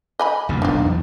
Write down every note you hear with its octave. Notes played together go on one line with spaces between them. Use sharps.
D#5 G#5 B5
F#1 D2 A#2
D#1 B1 D4 D#4 F4
E2